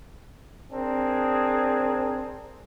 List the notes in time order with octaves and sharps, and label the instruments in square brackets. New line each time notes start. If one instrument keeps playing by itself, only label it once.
[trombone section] C4 D4 G#4 A#4